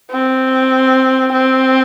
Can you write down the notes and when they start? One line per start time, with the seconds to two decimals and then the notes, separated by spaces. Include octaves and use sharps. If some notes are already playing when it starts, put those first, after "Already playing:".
0.11 C4
1.32 C4